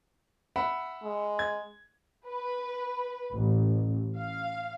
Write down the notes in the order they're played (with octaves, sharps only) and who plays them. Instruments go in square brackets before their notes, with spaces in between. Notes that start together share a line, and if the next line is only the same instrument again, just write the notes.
[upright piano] E5 F#5 B5
[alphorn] G#3
[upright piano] G#6
[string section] B4
A1
F5